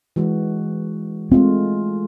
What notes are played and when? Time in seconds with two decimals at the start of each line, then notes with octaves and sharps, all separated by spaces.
0.16 E3 G#3 F#4
1.32 G#3 A3 C4 F4